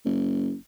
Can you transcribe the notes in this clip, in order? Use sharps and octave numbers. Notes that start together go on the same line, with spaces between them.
F#1